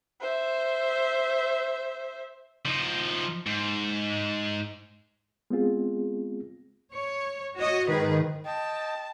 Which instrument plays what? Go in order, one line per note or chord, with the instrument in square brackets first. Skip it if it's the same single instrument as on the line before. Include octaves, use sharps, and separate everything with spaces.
[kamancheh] C5 E5
[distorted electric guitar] F3 D#4
G#2
[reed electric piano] G#3 B3 C4 F4 G#4
[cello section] C#5
F#4 C#5 D#5
[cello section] G#2 G#4 B4 [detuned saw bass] D#3
[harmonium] D#5 G5 [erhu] A5